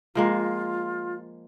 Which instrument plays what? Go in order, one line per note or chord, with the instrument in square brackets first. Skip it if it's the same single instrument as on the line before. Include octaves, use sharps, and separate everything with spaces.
[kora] F3 G#3 A#3 [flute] F4